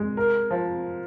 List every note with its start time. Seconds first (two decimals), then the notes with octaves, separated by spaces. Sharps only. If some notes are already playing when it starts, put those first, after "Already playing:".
Already playing: G#3
0.17 A#4
0.51 F3